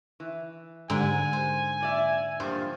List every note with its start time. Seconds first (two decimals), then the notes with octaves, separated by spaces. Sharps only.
0.20 E3
0.90 G#2 D3 G5 G#5
1.33 C5
1.81 A#2 D5 E5
2.40 G2 A#2 F3 C5